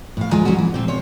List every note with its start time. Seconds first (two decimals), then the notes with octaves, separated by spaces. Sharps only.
0.17 A2 F5
0.31 D2 G#3 F4 G#5 A#5
0.45 F#3 G#3 C4 C#4 F#4
0.58 E3
0.74 A#2 C4
0.88 A#2 C5 C#5